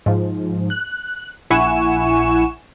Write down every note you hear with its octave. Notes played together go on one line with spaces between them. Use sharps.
G#2 F3
F#6
A#1 E4 F#5 G#5 C#6 E7